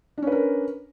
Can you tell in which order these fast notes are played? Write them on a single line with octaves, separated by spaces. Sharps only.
D4 C#4 B4 A#4